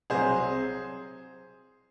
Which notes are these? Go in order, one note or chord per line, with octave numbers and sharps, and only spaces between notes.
C2 C3 F#3 G#4 C5